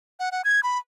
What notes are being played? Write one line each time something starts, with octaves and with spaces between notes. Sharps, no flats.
F#5
F#5
G#6
B5